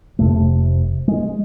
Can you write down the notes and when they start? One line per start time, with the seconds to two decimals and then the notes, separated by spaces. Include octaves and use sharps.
0.19 F1 F2 C3 A3
1.08 G#3